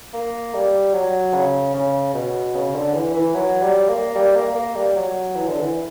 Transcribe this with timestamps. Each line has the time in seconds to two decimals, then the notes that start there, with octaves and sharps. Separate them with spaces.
0.14 A#3
0.54 G3
0.94 F#3
1.34 C#3
1.74 C#3
2.14 B2
2.55 C#3
2.75 D3
2.94 E3
3.14 E3
3.35 F#3
3.62 G3
3.88 A#3
4.15 G3
4.35 A#3
4.55 A#3
4.75 G3
4.96 F#3
5.35 E3
5.48 D3
5.60 E3